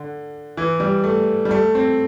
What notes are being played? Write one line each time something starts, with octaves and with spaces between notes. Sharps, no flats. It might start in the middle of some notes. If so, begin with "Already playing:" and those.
Already playing: D3
E3
G3
A3
G3
A3
C4